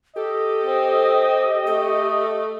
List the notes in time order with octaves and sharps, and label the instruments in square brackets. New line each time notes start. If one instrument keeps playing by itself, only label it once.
[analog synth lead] G4 [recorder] A4 [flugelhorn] D#5
[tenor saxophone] C4
[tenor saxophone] A3 [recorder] A4